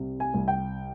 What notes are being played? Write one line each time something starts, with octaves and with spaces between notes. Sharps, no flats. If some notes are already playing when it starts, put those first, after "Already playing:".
Already playing: C2 C3
G#5
C2
G5